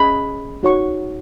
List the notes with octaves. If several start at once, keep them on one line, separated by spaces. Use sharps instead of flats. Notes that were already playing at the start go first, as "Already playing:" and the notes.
Already playing: C#4 G#4 D#5 G#5 B5
D#4 F#4 C#5 F#5 C#6